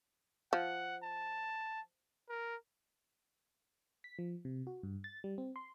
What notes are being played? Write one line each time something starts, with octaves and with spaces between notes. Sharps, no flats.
F3 F#5
A5
A#4
B6
F3
C3
F#4
G2
A6
G3
C4
C6